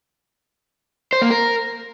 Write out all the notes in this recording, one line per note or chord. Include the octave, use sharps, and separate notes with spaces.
C5
A#3
A#4